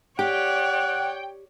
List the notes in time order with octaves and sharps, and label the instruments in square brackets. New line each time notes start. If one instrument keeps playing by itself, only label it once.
[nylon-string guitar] G4 [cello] C#5 D5 [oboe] F#5 [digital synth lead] G5